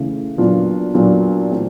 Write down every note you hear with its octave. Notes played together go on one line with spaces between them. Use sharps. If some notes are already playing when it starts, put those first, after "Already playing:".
Already playing: C#3 E3 A3 C#4 E4
A#2 F#3 B3 D4 F4
A#2 F#3 B3 D4 F4
E3 A3 C4 E4